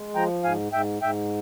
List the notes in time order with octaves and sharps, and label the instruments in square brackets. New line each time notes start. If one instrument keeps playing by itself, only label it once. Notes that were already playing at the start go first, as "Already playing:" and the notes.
Already playing: [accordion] G#3
F3 G5 A#5
G#2 F5 G#5
G#2 E5 G5
G#2 E5 G5